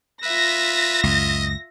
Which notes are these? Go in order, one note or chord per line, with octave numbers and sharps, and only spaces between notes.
F4 B4 E5 A#6
C#2 F#2 D#5